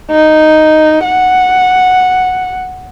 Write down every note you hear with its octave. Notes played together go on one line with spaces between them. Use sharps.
D#4
F#5